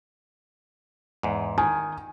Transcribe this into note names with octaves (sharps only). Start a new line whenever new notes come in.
E2 G#2
D#3 G#5